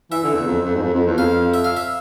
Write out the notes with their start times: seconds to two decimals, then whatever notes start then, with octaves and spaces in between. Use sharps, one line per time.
0.11 E3 E5
0.23 D3
0.34 E2
0.47 F2
0.65 F2
0.75 G#2
0.82 F2
0.94 F2
1.07 E2
1.18 F2 F5
1.54 E5
1.64 F5
1.77 E5